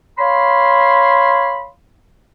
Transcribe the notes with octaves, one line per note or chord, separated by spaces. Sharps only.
C#5 F5 B5 C6